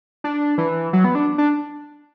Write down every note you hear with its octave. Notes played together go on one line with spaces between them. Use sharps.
D4
E3
F#3
B3
D4
D4